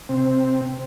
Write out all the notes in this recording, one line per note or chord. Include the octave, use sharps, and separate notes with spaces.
C3 C4